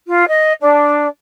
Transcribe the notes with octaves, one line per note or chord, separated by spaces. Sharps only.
F4
D#5
D4